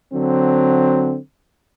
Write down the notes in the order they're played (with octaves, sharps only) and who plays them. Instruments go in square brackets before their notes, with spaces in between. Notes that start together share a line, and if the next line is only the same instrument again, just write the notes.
[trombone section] D3 F#3 C4